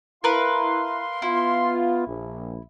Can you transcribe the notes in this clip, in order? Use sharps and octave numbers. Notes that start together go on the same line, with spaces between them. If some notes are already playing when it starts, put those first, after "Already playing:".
E4 A#4 B4 F5 C6
B3 E4 F4
A#1